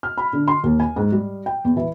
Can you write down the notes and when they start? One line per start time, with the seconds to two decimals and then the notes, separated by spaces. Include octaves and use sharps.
0.03 F6
0.18 B5
0.33 D3
0.48 C6
0.63 D#2
0.80 G#5
0.96 G#2
1.12 G3
1.46 G5
1.64 E2
1.77 E3